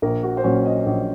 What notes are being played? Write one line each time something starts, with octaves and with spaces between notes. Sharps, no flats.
A#1 A#4
F#4
C5
A#2 F#3 C#4 C#5
D#5
A#1